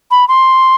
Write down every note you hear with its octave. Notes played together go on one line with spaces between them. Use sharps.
B5
C6